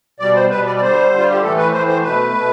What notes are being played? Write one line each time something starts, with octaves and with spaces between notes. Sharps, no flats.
B2 G3 D5
C5
B2 G3 B4
D5
D5
D3 G3 C5
D3 G3
F4
G4
A2 E3 A3 A4
B4
A2 E3 A3 C5
C5
B2 A3 B4
B2 A3